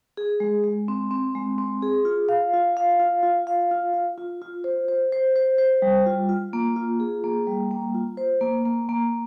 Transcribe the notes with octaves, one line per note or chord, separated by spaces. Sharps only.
G#4
G#3
G#3
C4
C4
G#3
C4
G#4
F4
F5
F4
F5
F4
F4
F5
F4
F4
F4
F4
C5
C5
C5
C5
C5
G3
F4
F4
A#3
F4
G#4
A#3
G3
A#3
F4
C5
A#3
A#3
A#3